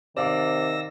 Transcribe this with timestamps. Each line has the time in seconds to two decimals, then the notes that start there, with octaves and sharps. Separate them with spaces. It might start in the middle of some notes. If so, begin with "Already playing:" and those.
0.17 C3 D#3 D5 F5 D6 E6 A#6